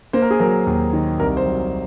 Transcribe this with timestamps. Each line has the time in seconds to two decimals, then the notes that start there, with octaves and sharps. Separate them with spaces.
0.13 A#3 C5
0.22 A#4
0.31 G#4
0.39 F#3 A#4
0.66 D#2
0.93 D#3
1.19 C2 A#4
1.37 C5
1.46 F#3